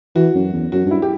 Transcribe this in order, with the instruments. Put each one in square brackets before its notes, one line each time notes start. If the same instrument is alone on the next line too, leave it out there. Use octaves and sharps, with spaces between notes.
[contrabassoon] E3 [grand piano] F#4
[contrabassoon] F#2
E2
[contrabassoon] F#2 [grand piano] F#4
[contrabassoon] G2
[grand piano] E4
G4